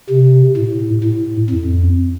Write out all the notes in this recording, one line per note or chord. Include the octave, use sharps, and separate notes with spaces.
C3
A2
A2
F2